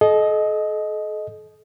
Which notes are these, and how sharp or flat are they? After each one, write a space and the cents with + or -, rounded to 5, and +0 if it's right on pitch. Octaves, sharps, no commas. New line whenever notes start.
A4 -40 D#5 +0